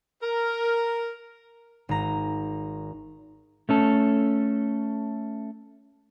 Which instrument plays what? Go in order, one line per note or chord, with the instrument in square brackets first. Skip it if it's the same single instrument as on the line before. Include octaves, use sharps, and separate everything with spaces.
[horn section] A#4
[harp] G#1 A#5
[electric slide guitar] A3 C#4 A4